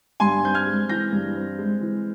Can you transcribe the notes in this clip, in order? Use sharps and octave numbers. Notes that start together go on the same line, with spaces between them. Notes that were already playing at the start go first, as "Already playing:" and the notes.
G2 G#5 C6
C4 G6
F6 G#6
G#3
E3 G6 A#6
G2
C4
G#3
E3